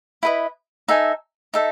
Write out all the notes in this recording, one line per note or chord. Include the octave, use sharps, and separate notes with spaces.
E4 B4 D#5
D#4 A4 E5 G#5
D#4 A4 E5